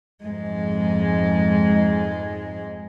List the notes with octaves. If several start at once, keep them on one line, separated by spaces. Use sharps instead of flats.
F2 G#2 G#3